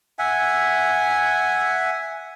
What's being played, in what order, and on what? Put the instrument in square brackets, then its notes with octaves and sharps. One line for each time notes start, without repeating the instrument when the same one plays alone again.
[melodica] E5 F#5 G#5